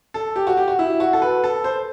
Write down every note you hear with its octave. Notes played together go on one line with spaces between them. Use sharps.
A4
G4
F#4
G4
F#4
E4
F#4
A4
B4
A4
C5